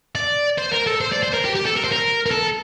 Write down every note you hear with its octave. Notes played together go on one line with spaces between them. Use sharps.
D5
C5
A#4
A4
C5
D5
C5
A#4
G4
G4
A4
A#4
C5
A#4
A#4
A4